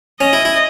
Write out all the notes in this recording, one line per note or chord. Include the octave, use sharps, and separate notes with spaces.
C#4 D#5
E4
E4